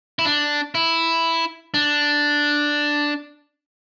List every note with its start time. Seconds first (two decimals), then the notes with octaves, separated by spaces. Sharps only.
0.19 E4
0.25 D4
0.75 E4
1.74 D4